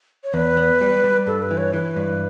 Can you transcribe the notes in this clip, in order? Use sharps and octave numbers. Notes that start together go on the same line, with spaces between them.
C#5
E2 B4
B3
G3
G3
G2 A4
B4
E3
C#5
E3 B4
G2